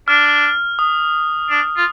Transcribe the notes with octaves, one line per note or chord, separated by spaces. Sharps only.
D4 F6
D#6
D4
F4